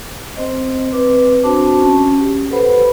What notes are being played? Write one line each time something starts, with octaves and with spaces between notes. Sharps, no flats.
C4 C5 D#5
C4 B4 D6
C4 D4 F#4 C5 A5 D6
C#4
G4
A4 B4 C5 F#5 B5